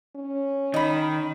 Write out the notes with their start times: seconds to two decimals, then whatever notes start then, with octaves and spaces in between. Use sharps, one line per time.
0.16 C#4
0.74 D#3 D#5 B5